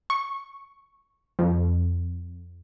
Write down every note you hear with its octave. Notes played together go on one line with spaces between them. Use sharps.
C#6
F2